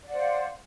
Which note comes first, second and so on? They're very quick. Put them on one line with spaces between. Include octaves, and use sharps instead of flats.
D5 F#5 C5 F5